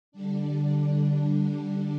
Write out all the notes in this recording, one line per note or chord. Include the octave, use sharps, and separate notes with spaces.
D3 G3 D4